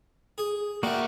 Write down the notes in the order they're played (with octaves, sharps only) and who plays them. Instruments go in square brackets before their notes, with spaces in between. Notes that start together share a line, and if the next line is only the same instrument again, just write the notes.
[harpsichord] G#4
[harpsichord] G3 [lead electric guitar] A#3 E5 [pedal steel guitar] F#4 A#4 D5